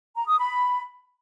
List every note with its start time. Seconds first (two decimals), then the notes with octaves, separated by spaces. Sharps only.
0.15 A#5
0.27 D#6
0.38 B5